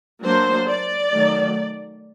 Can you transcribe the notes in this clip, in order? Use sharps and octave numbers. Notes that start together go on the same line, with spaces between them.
F#3 A#3 D4 C5
D5
D#3 F#3 A3